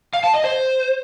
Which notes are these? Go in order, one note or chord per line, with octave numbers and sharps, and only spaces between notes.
F5
A5
D#5
C5